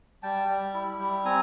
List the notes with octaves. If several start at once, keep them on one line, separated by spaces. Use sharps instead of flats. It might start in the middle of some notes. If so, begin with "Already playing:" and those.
G3 G5 A5
G3
E4
G3
C4 G#5 A#5